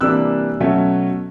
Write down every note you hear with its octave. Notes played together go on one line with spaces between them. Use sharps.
C3 E3 G3 A#3 D4 E6 F#6
B2 F#3 A3 C#4